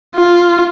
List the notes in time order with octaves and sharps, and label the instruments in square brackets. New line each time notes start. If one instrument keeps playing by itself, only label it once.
[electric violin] F4